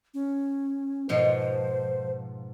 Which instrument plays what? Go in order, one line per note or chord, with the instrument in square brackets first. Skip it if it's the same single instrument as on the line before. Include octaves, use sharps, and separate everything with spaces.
[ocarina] C#4
[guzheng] G#2 B2 F3 [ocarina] C5